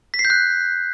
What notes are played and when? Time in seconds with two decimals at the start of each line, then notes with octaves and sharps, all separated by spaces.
0.14 B6
0.19 C7
0.25 G6
0.30 F#6